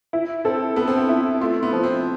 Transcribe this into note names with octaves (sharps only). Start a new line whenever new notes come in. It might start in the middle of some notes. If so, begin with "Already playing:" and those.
E4
C4 A4
B3 A4
C4
B3
E4
A3 F4
B3
F3
C4